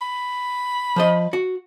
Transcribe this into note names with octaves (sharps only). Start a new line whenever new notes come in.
B5
F3 C5 D#5
F#4